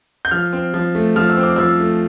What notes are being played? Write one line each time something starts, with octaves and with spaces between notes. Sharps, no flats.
G6
F3 F6
C4
F3
A3
F3 F6
E6
C4
D6
F3 E6
A3